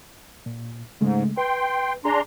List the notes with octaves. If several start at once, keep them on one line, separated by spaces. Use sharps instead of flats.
A#2
G#2 C#3 G#3 A3
B4 G5 C6
D4 G#4 G#5 A#5 C6